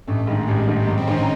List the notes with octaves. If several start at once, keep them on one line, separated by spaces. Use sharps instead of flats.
A1 A3
G#2 D#3 G#3
A1 G3
G#2 D#3
G3
A1 F#3
C4
G#2 D#3 C#4
D#4